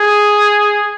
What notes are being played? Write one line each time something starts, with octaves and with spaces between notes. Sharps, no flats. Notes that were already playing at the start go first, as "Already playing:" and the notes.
Already playing: G#4